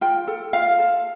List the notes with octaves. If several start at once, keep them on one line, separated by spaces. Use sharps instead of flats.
F4 G5
A4
F4 F5
A4